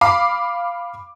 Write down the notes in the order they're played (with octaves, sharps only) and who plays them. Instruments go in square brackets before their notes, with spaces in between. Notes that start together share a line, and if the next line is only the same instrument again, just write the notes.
[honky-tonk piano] F5 B5 D6